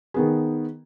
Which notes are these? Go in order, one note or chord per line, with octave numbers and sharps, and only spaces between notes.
D#3 B3 G#4